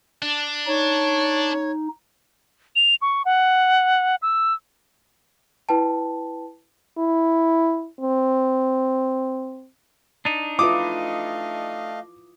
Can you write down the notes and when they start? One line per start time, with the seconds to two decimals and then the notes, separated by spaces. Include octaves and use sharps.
0.22 D4
0.67 D#4 C#5
2.76 F7
3.02 C#6
3.25 F#5
4.22 E6
5.69 E4 B4 G5 A5
6.98 E4
8.01 C4
10.25 D4 D#4
10.59 A3 E4 F4 B4 D#5 F5 D6 D#6